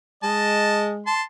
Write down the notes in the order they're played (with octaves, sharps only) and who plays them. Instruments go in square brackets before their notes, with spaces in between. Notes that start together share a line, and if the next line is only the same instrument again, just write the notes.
[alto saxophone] G#3 [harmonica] D#5 A5
[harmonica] A5 C6